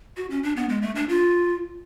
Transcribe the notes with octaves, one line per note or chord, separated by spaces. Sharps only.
F#4
C#4
D4
B3
G#3
A3
D4
F4